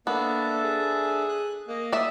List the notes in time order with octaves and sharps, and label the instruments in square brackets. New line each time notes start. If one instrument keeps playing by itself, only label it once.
[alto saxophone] A#3 [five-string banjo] B3 [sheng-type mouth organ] D4 A4 E5
[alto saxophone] G#4
[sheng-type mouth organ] F#6
[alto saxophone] A#3 [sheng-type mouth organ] D#5
[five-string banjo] D5 E5 [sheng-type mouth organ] D#6